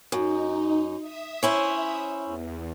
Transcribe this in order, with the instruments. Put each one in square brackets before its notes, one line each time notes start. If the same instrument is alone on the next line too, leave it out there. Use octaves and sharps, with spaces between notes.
[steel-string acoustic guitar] F#2 [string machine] D#4
[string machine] E5 D#6
[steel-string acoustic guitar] C#4 E4 C5
[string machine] E2